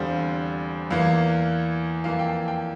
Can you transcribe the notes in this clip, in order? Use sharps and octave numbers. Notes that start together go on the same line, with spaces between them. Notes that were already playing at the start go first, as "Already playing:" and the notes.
Already playing: E2 D3 G3 C4 F5
E2 E3 A#3 F5
F2 E3 A#3 F5
G5
G5